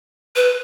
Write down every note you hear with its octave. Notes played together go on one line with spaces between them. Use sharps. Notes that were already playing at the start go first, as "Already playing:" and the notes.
B4